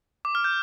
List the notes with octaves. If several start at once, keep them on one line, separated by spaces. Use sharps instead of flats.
D6
F6
G6